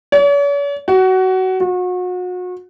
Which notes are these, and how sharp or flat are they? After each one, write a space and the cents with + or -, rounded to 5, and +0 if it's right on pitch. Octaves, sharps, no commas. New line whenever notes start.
C#5 +45
F#4 +20
F#4 -35